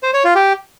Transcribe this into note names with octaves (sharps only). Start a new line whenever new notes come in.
C5
C#5
F4
G4